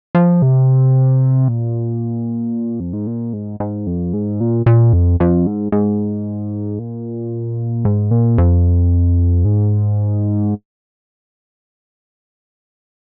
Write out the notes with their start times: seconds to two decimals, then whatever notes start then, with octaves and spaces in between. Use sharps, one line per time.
0.15 F3
0.42 C3
1.48 A#2
2.80 F2
2.93 G#2
3.07 A#2
3.33 G#2
3.60 G#2
3.87 F2
4.13 G#2
4.41 A#2
4.66 A#2
4.93 F2
5.20 F2
5.47 G#2
5.72 G#2
6.79 A#2
7.85 G#2
8.11 A#2
8.38 F2
9.45 G#2